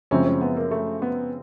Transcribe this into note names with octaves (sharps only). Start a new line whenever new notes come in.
F#2 C#3 F3 G#3 C4 C#4
C#4
B3
A#3
A3
B3